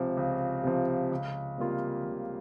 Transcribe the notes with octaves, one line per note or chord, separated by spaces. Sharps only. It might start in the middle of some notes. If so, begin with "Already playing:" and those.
Already playing: C#2 C3 F3
C#2
C3 F3
C#2
C3 G3 A#3 F4
C#2